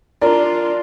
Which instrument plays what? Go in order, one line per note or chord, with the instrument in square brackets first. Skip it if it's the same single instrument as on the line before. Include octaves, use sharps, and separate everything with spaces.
[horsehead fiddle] D4 F4 [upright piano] A#4 D5